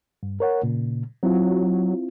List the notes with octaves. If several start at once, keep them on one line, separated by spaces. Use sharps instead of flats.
G2
A#4 C#5 F#5
A#2 C#3
F#3 C4 E4 F4